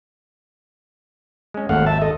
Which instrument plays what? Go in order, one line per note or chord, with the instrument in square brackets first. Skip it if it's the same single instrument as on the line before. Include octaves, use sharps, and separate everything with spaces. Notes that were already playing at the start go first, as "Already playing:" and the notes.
[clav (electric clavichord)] G#3 C#4
[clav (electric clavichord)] G#1 D#2 [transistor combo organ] A3 F5 F#5
[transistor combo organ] E5 A5
A4 D#5